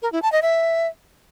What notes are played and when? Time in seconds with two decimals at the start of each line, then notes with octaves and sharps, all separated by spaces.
0.02 A#4
0.12 E4
0.22 A5
0.32 D#5
0.42 E5